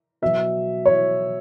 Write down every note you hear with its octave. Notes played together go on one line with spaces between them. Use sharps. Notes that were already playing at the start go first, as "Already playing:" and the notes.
B2 F#3 E5
C#5